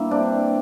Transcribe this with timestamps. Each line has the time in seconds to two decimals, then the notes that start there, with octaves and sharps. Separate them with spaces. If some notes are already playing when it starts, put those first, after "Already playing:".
Already playing: G2 A#3 E4
0.11 C3 D4